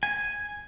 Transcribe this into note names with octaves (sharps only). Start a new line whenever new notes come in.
G#5